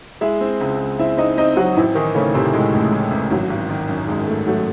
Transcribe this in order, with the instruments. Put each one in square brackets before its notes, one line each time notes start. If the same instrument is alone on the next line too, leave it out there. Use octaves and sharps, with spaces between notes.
[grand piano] G#3 [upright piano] E4 E5
[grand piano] C4
C#2
C#2
[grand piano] C4 [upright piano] E4 E5
[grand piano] C4 [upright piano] D#4 D#5
[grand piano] C4 [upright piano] D#4 D#5
[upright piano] F#3 F#4 [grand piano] C4
[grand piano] A1 [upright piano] E3 E4
[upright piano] D#3 D#4 [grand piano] E3
[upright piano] C#3 C#4 [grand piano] A3
[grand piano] A1 [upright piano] C3 C4
[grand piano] A2 [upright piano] G#3
[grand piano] A1 [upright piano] A3
[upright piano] G#3
[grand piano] A2
A1
[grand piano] G#1 [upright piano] F#3
[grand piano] G#1
D#3
F#2
[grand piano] G#1 [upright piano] G#3
[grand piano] A3
[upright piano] F#3 [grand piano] A3